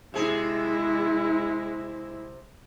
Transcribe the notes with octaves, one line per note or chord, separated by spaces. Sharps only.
C3 G#3 E4 G#4